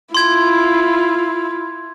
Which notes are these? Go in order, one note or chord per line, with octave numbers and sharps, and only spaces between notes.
E4 F4 C6 G#6